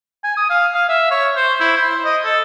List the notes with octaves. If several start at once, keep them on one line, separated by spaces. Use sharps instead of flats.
G#5
D#6
F5
F5
E5
C#5
C5
E4
C5
D#5
A4